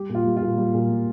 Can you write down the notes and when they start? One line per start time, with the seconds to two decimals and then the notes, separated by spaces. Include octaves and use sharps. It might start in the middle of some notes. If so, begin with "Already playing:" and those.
Already playing: G3 G4
0.09 A#2
0.15 F4
0.26 G3
0.37 F4
0.42 A#2
0.58 G3
0.74 A#2
0.91 G3